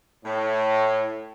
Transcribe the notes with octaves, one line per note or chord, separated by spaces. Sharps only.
A2